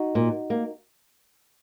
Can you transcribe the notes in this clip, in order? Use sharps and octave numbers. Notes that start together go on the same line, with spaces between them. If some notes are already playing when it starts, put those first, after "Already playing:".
Already playing: D#4 F#4
A#2
A#3